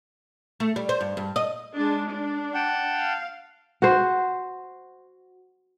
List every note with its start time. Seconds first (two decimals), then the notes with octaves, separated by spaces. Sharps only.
0.60 A3
0.76 G3
0.89 C5
1.01 G2
1.17 G2
1.36 D#5
1.75 G#3 D4
2.09 D4
2.54 F#5 G5 A5
2.94 F5
3.82 F#4 C5